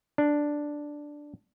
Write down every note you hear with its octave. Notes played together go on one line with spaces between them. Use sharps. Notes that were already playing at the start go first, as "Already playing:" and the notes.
D4